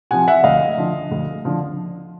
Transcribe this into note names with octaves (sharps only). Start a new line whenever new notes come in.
C3 F3 F#5 G#5
E5 F#5
D2 D#5 F5
D3 F3
D2
D3 F3